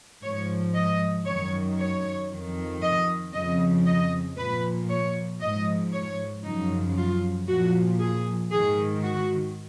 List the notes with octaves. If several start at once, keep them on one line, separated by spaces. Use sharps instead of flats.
G#2 F3 C#5
D#5
F#2 D#3 C#5
C#5
F2 D#3
D#5
F2 C#3 F3 D#5
D#5
A#2 F3 B4
C#5
G#2 F3 D#5
C#5
F#2 C#3 F3 D#4
F4
A#2 F3 F#4
G#4
G#2 D#3 G#4
F#4